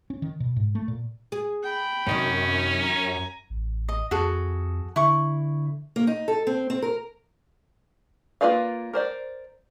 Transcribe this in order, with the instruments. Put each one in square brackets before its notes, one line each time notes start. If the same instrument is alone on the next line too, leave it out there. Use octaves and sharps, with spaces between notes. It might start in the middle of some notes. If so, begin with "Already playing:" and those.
[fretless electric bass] C#4
D#3
B2
G#2
A3
A#2
[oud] G#4
[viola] G5 B5
[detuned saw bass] F#2 [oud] C3 D#3 C#5 [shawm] C#4
[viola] G#5 A#5
[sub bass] A1
[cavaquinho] D#5
[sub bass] F2 [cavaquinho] F#4 G#4 A4
[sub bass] D3 [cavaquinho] E4 C#6
[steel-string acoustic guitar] A#3
D#4
A4
C4
C4
A#4
[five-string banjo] A#3 F4 B4 D5 F5
A#4 C5 D5